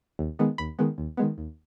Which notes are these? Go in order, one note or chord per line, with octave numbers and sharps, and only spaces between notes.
D#2
D#3 G#3 B3
D#2 B5
D#3 G#3 B3
D#2
D#3 G#3 B3
D#2